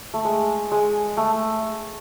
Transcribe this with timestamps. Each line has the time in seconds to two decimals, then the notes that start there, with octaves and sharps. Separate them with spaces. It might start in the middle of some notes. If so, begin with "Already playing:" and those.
0.14 A3
0.25 G#3
0.72 G#3
1.17 A3